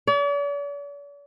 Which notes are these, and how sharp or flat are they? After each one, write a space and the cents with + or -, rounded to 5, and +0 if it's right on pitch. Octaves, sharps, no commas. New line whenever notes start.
D5 -45